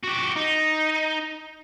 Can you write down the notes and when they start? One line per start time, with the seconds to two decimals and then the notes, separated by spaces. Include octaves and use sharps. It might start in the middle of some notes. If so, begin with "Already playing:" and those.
0.03 F#4 G4
0.36 D#4